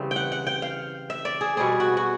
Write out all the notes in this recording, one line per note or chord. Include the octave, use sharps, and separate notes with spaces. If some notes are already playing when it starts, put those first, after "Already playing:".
Already playing: C#3 E3 G3 C4
G5
F#5
F#5
G5
F5
E5
D5
G#4
B2 G3 C4 G#4
F#4
F#4